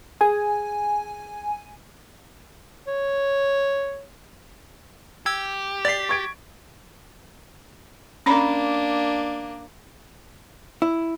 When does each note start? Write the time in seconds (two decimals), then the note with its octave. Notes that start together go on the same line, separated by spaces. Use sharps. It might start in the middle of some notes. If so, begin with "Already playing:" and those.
0.21 G#4 G#5
2.87 C#5
5.26 G4 E6 G#6
5.85 D5 A6 B6 C7
6.09 C#6 G#6 D7
8.26 A#3 C#4 D4 A#5 B5
10.82 E4